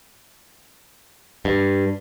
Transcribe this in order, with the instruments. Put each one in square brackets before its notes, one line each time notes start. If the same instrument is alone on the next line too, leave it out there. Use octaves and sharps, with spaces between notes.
[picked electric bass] G2